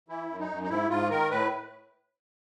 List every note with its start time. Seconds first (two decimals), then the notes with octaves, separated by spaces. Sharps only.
0.08 E3 E4
0.29 F#2
0.40 D#4
0.49 F#2
0.63 D#4
0.69 G#2 E4
0.90 G#2 F4
1.10 D#3 A#4
1.31 A2 B4